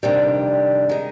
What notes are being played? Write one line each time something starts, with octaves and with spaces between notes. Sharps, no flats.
F2 C3 D#3 G3 D4
D#3 G#3 D#4